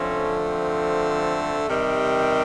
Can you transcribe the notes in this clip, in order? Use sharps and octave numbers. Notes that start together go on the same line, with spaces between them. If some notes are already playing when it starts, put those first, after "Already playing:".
Already playing: D3 F3 A3 C4 C#4
C4
C3 D#3 G3